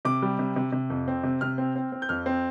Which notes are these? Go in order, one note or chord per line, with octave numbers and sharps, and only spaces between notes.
C3 D6
G3
C3
C3
C3
F2
C4
C3
C3 F6
C4
C4
C4
G6
F2 F6
C4